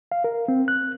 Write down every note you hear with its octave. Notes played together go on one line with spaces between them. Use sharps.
F5
A#4
C4
F#6